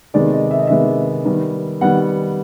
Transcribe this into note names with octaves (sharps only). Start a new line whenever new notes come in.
C3 D#3 G#3 B3 D5
D#5
E5
D#5
C3 D#3 G#3 B3 E5
D#3 G3 B3
D#3 G3 B3 F#5